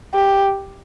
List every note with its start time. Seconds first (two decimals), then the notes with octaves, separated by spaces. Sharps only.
0.15 G4